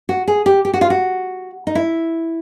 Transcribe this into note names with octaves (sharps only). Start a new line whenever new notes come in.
F#4
G#4
G4
G4
F#4
F4
F#4
D#4
E4